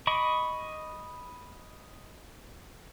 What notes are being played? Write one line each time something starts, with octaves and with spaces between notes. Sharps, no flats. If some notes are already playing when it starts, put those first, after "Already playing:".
D#5 B5 C#6 D6